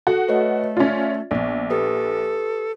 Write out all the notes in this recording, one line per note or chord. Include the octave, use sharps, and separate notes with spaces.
F#4 A4
A3 B4 C#5 D#5
C#4 F4 D5 E5
A#1 B3 D5
G4 A4 B4 D#6